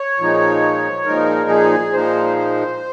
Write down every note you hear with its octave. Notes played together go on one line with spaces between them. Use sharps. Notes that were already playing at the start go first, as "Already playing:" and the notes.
Already playing: C#5
A#2 F3 G#3 D#4
A#2 F3 G#3 D#4 A#4
G#4
A#2 F3 G#3 D#4 C5
C5